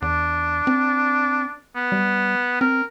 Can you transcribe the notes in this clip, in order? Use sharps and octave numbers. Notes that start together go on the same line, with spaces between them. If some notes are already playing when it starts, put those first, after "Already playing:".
E2 D4
C4
B3
G3
C4 A#4